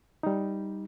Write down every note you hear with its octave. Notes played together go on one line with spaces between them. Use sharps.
G3 D#4